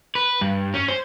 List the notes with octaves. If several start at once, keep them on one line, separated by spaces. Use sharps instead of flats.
B4
G2
C#4
C5